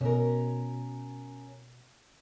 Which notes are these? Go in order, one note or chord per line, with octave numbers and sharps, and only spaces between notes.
B2 C#4 A#4